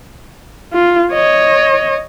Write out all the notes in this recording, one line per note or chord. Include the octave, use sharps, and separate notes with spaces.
F4
C#5 D#5